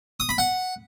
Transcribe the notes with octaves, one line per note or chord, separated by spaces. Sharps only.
D#6
B5
F#5